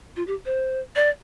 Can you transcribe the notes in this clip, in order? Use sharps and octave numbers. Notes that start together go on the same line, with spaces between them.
F4
G4
C5
D5